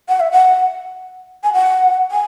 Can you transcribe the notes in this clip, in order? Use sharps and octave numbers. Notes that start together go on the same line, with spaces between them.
F#5
E5
F#5
G#5
F#5
G#5